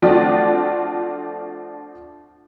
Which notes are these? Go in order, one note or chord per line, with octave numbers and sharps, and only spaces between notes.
F3 A3 C4 D4 F4 F#4